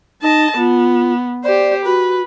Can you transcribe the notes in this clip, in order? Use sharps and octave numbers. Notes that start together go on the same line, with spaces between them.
D#4 D#5 A5
B3 F4
G4 C5 D5
F#4 B4